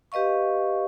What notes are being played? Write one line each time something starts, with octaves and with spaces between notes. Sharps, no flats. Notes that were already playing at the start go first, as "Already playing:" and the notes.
G4 B4 D#5 F5 C#6